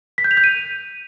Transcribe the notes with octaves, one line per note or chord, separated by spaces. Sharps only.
B6
G6
F7
G6
D#7